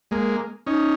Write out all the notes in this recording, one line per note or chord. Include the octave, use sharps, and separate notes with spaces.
G#3 A#3
C#4 D#4